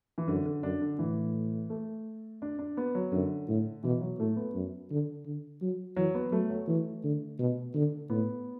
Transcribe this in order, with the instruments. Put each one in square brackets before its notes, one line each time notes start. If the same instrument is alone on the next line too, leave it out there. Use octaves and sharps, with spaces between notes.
[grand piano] E3
[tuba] F#2 [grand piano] D3
[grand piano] D3
[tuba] F#2 [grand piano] D4
[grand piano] D3
[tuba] A2 [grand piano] E3
[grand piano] A3
D4
D4
B3
F#3
[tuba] F#2 [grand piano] D3
[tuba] A2
[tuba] B2 [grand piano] E3
[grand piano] F#3
[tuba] A2 [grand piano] A3
[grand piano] B3
[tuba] F#2
D3
D3
F#3
[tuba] E3 [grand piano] F#3
[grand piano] B3
[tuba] F#3 [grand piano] A3
[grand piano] F#3
[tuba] E3 [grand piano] A3
[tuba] D3
B2
D3
[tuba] A2 [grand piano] B3